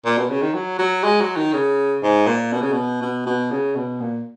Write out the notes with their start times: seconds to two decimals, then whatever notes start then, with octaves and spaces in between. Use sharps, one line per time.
0.05 A#2
0.18 B2
0.30 C#3
0.42 D#3
0.54 F#3
0.79 F#3
1.04 G#3
1.21 F#3
1.36 D#3
1.53 C#3
2.03 G#2
2.27 A#2
2.53 B2
2.62 C#3
2.72 B2
3.01 B2
3.26 B2
3.51 C#3
3.76 B2
4.01 A#2